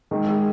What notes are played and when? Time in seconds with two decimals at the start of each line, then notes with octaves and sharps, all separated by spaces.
0.11 D#3 G#3
0.28 G#4